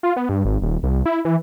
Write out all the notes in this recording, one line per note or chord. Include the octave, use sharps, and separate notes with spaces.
F4
B3
G2
G#1
D#1
C2
E4
E3